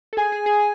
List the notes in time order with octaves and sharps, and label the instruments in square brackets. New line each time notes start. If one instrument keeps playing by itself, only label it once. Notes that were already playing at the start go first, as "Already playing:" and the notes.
[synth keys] A4
[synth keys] G#4 [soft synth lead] G#5
[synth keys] G#4
G#4